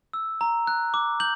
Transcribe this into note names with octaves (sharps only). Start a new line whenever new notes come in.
E6
A#5
F#6
D6
G6 F#7